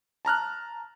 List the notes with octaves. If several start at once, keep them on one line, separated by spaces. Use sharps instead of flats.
A5 A#5 F6 F#6